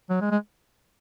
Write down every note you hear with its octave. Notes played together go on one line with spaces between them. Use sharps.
F#3
G#3
G#3